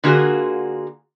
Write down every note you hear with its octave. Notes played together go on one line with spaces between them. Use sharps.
D3 A#3 F4 F#4 G#4